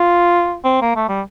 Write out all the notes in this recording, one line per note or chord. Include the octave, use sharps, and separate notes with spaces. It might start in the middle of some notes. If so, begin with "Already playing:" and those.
Already playing: F4
C4
A#3
A3
G3